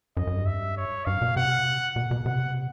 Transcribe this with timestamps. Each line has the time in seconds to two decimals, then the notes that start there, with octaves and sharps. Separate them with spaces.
0.17 F#2 D#5
0.27 F#2
0.36 G2
0.46 E5
0.77 C#5
1.06 G2 F5
1.22 B2
1.37 C3 F#5
1.96 B2
2.11 B2
2.26 C3 F#5